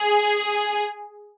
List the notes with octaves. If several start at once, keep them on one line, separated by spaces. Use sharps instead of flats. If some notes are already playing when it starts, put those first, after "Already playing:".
Already playing: G#4